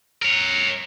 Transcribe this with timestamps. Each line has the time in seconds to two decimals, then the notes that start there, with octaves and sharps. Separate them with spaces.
0.22 A#4 C#5